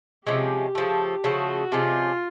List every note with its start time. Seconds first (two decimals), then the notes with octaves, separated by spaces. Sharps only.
0.26 C3 F3 G#3 C#4 G4
0.75 C#3 F3 A3
1.24 C#3 F3 A3 F#4
1.72 C3 F3 G#3 C#4 F4